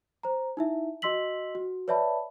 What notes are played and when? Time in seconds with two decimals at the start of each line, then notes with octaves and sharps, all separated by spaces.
0.23 C5 A#5
0.57 D#4 E4 E5
1.02 F#4 D#5 C6 E6 B6 F#7
1.55 F#4
1.88 B4 C#5 D5 E5 A5 B5